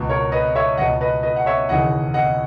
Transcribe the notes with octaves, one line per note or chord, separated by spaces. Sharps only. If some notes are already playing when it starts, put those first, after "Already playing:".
Already playing: C#2 B2
A#4 C#5
B4 D#5
C#5 E5
C#2 B2 D#5 F#5
B4 D#5
B4 D#5
F#5
C#5 E5
E1 D#2 C#3 E3 D#5 F#5
D#5 F#5